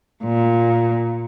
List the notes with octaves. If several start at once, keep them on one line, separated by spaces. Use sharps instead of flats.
A#2